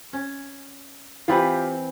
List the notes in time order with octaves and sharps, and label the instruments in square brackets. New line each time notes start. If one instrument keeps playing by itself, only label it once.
[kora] C#4
[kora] E3 C4 B4 [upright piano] F4 G4 B5